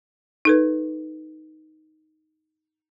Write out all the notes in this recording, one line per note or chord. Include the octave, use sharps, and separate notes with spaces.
D#4 A4 B4